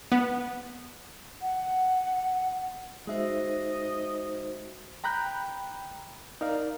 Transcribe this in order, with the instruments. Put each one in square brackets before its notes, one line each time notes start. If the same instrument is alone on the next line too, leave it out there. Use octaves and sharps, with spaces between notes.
[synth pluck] B3
[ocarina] F#5
[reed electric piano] G#3 E5 [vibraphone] D#4 F#4 C5 [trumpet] D#5
[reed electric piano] G5 A#5 B5 F#6 G6
D#4 A#4 D5 F5